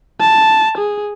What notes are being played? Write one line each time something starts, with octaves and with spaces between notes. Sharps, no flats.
A5
G#4